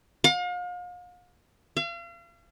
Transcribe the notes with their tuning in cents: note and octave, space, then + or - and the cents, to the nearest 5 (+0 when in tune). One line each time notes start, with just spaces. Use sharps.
F5 +40
F5 -40